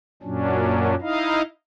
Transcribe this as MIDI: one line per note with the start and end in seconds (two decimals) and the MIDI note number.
0.23 0.95 42
0.23 0.95 46
0.23 0.95 54
0.23 0.95 61
0.23 0.95 62
1.01 1.42 63
1.01 1.42 64
1.01 1.42 75
1.01 1.42 77